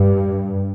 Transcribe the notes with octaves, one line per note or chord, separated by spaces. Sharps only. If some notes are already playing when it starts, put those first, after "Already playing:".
Already playing: G2